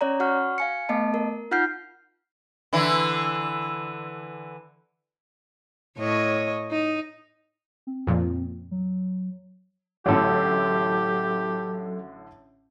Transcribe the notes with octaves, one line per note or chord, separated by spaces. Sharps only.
C#4 C#5 D5 A#5
F#4 F#5 C#6 F6
F5 G#5 C#7
A3 B3 D#5 A5
A#4
D#4 F4 F#5 F6 G6 C7
D3 E3 E4
A2 C#5 D#5
D#4
C4
F2 A#2 F3
F#3
A1 A2 D3 F#3 G4 A4